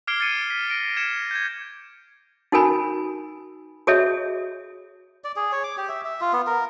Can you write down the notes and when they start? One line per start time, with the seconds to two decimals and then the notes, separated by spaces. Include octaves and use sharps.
0.07 D6 F6 G#6 C7 D7 G7
0.20 G#6 A6 C7 C#7 D#7
0.50 B6
0.70 A#6 D7
0.97 G#6 C#7 E7
1.31 G6 G#6
2.52 D#4 F#4 A4 A#4 G#5 B5
3.87 F#4 G#4 A4 C#5 D#5 E5
5.24 D5
5.36 G#4
5.52 C#5
5.64 D6
5.78 G4
5.89 E5
6.05 E5
6.21 F4
6.33 B3
6.47 A#4